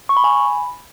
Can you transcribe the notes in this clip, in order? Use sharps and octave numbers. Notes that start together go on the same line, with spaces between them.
C#6
B5
G#5
B5